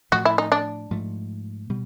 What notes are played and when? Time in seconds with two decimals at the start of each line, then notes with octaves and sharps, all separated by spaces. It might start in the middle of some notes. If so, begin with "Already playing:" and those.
0.12 A2 F3 A3 F#4
0.25 E4
0.38 D#4
0.52 D4
0.91 G#2 F3 A3
1.70 B2 G3